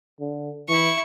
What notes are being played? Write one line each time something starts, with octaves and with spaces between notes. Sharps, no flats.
D3
E3 E4 C#6